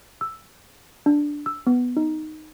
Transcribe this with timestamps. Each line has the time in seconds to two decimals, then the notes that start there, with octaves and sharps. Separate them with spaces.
0.21 E6
1.06 D4
1.46 E6
1.67 B3
1.97 D#4